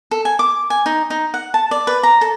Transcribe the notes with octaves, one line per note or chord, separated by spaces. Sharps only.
A4
G#5
D6
G#5
D#4
D#4
F#5
A5
D5
B4
A#5
A4